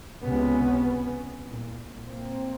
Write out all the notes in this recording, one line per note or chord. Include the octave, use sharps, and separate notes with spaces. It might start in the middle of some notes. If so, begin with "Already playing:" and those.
C#2 C3 B3 C#4
C2 A#2
A#3 C4